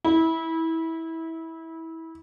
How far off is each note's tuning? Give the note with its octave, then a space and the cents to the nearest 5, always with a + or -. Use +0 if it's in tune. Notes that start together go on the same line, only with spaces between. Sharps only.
E4 -20